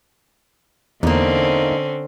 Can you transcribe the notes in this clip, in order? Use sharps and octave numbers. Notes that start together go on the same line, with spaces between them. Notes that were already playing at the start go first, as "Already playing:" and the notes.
E2 D3 A#3 C4 C#4 D#4